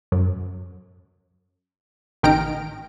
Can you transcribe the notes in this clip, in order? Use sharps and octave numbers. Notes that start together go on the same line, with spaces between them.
F#2
A1 D#3 G5 F6 A#6 D7